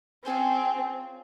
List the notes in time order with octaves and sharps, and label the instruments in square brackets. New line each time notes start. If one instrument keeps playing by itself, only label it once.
[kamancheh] C4 [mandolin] C#4 F4 G#4 C5